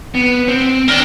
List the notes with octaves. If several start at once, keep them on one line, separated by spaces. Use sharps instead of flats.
B3
C4
C4 D4 A#4 G5